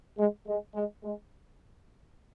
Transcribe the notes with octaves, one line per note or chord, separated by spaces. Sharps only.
G#3
G#3
G#3
G#3